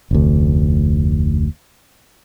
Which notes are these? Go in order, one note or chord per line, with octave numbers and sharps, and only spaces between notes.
F1 D2